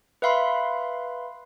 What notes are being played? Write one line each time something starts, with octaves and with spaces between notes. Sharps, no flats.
B4 E5 F5 B5 C6